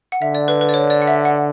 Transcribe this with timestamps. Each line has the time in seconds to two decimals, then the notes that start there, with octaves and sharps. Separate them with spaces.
0.12 F#5
0.22 D3 E5
0.35 D5
0.48 B4
0.61 B4
0.69 D5
0.74 C#5
0.90 D5
1.02 F#5
1.07 E5
1.25 F#5